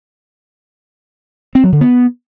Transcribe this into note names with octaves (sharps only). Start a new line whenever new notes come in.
C4
F#3
D3
B3